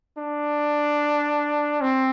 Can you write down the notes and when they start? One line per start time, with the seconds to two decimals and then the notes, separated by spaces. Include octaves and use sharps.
0.18 D4
1.81 C4